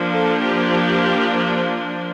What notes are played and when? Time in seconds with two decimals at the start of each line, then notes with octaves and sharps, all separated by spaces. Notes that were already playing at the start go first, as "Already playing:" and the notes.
Already playing: F3 A#3 D4
0.11 A4
0.41 G4